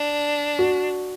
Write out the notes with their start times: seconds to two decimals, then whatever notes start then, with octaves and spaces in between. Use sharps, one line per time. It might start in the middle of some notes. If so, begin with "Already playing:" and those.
Already playing: D4
0.59 F#4